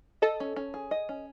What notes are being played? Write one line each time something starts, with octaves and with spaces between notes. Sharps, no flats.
A4 D#5
C#4
C#4
G#4
D#5
C#4